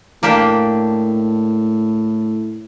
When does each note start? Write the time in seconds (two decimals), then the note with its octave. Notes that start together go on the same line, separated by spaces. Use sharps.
0.23 A2 A#3 D4 G4